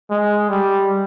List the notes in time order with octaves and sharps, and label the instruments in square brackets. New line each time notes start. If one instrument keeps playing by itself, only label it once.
[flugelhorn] G#3
G3